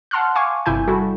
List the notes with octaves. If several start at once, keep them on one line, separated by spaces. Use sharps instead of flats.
F#5 A5 C6 F6 F#6
F5 G#5 C#6 D6
G1 G2 C3 E4 G#5 G6
G3 E4 F#4 A4